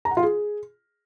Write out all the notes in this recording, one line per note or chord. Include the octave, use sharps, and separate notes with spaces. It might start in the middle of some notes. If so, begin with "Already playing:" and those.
A#5
F#5
F4
G#4